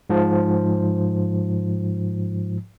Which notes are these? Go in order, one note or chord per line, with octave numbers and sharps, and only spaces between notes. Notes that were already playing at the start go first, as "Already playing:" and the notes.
G#2 F3